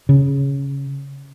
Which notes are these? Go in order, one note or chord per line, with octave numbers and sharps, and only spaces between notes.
C#3